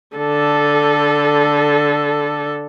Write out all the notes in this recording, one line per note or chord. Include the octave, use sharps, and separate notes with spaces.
D3 A4